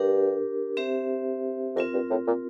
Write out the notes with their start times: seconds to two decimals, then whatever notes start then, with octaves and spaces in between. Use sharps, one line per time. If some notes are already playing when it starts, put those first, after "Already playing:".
Already playing: G2 D4 G4 A#4
0.77 C4 G4 C5 E5
1.76 F2 C4 F4 A#4
1.93 G2
2.10 A2
2.27 A#2